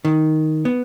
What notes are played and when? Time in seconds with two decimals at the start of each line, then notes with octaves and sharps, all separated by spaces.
0.05 D#3
0.65 B3